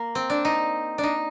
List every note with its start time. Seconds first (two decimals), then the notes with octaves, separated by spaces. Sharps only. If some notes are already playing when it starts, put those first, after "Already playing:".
Already playing: A#3
0.15 C4
0.30 D4
0.45 D#4
0.98 D4
1.03 D#4